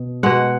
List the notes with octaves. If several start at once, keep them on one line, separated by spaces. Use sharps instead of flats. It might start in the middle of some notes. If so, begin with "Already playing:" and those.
Already playing: B2
B2 G#3 F#5